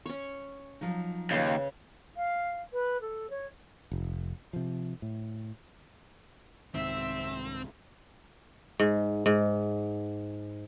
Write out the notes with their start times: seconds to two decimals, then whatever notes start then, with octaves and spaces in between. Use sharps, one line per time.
0.06 C#4 C#5
0.81 F3 F#3 D#4
1.31 D#2 C#3 B4
2.16 F5
2.72 B4
3.01 A4
3.30 C#5
3.91 F1
4.53 C3 F3
5.02 A2
6.75 C2 G#2 D#3 C4 E5
8.80 G#2
9.26 G#2